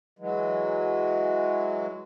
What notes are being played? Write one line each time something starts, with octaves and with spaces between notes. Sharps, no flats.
E3 F#3 G#3